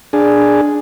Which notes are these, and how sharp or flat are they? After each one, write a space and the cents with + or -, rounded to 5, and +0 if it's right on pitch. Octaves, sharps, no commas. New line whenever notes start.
D4 +0 G#4 +0